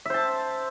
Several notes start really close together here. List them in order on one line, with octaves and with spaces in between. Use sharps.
E5 C5 A5